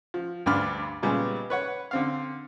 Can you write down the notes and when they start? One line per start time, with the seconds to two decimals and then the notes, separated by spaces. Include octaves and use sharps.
0.14 F3
0.46 D2 G2 D4 B5 D6 F6
1.03 A#2 C#3 G3 G#3 B3 C#4
1.50 B4 C#5 F#5
1.91 D3 C4 F5